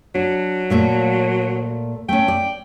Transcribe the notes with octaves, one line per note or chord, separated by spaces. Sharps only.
F#3 D4
A#2 A3 A#3
A3 C#4 G5
D5